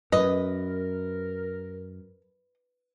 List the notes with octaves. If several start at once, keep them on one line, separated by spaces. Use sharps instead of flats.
F#2 A#4 B4 D#5